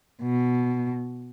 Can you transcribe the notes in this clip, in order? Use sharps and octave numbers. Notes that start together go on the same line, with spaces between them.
B2